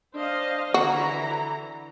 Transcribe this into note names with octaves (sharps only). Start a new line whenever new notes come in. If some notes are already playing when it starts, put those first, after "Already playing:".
D4 C5 D#5 F5
D3 E3 F#4 A#5